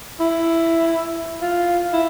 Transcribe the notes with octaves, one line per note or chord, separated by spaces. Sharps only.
E4
F4
E4